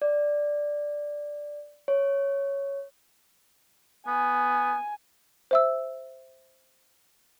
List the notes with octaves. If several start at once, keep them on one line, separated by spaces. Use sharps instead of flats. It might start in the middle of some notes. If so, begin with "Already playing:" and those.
D5
C#5
B3 G#5
C5 E5 E6